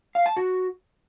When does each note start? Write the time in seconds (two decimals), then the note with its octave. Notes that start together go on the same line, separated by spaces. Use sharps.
0.15 F5
0.26 A5
0.37 F#4